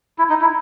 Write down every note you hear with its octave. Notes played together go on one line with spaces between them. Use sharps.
E4
D#4
E4